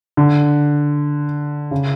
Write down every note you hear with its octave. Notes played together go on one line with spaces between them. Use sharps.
D3
C#3